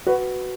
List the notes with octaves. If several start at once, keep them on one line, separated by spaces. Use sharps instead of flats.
F#4 B4